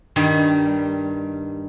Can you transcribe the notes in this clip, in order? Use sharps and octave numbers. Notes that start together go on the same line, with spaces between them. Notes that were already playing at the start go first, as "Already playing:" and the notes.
G2 D#3 G3